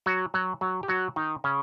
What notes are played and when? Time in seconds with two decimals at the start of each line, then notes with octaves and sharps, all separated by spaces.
0.06 F#3 F#4
0.34 F#3 F#4
0.61 F#3 F#4
0.83 G4
0.88 F#3 F#4
1.16 D#3 D#4
1.44 C#3 C#4